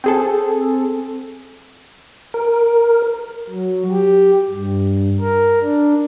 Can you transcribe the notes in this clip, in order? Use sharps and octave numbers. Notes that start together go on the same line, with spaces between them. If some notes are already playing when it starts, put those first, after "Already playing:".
C4 G#4 A4
A#4
F#3
G4
G2
A#4
D4